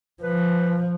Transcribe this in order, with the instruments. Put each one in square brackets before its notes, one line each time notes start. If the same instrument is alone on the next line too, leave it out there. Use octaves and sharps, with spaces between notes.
[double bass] F3 [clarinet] B4